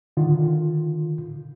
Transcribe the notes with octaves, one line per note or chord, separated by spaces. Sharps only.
D3 D#3 F4